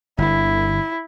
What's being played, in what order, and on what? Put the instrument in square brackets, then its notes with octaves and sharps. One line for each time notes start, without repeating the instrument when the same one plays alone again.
[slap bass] G1 D3 [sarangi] E4